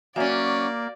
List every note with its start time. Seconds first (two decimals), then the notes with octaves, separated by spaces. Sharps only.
0.16 F#3 A#3 C#4 F#4 D5 E5 G#5